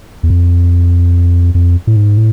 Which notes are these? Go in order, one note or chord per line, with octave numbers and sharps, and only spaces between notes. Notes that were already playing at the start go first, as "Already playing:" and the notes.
E2
F2
F2
A2
G#2
A2